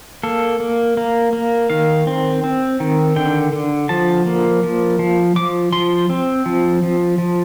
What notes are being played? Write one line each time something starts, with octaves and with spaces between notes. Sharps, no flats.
A#3 A4
A#3
A#3
A#3
D#3 F5
C4
C4
D#3
D3 G5
D3
F3 A5
A#3
F3
F3
F3 D6
F3 C6
C4
F3
F3
F3